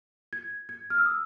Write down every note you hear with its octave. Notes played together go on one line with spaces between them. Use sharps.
G#6
G#6
F6
E6
D#6